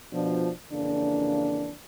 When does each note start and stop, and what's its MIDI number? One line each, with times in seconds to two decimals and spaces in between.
0.12 0.49 47
0.12 0.49 53
0.12 0.49 62
0.71 1.72 41
0.71 1.72 49
0.71 1.72 52
0.71 1.72 58
0.71 1.72 62